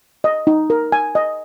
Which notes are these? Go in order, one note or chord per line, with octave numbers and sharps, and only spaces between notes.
D#5
D#4
A#4
G#5
D#5